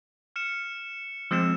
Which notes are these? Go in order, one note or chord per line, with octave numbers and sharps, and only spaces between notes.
F6 C#7 E7
F3 G#3 C4 E6 E7